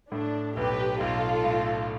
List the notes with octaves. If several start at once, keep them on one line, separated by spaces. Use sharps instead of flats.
A2 D4
B1 G4 B4
B1 F4 A4
A2